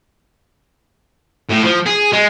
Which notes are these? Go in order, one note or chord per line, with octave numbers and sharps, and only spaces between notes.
A2
F3
G#4
G#3